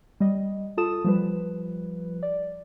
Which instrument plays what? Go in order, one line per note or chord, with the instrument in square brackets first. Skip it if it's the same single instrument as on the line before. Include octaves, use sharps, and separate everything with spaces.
[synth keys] G3 D#5
F4 A4 A5 D#6 E7
F3 G3 B4
D5